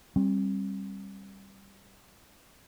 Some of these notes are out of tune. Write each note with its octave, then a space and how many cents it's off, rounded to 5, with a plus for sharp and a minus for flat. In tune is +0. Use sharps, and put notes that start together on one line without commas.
G3 +0 C4 +40